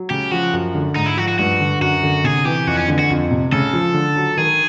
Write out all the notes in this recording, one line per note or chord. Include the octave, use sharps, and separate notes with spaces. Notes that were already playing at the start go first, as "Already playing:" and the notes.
Already playing: F#3
C#3 G4
F3 F#4
F#2
D3
G#2 D#4
E4
F3 F#4
F#4
G2 F#4
D3
F#2 F#4
D3
C3 G#4
E3 G4
F2 F#4
C#4
D3
F#4
F2
C3
C#3 A4
F3
D3
F#3
D#3 G#4